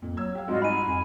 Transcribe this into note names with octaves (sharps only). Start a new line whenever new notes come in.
F2 A#2
F#3 E6 G#6
G4 F5
G#2 G3 C4 F4 F#4 D#5
D#4 G#5 B5 D#7
F2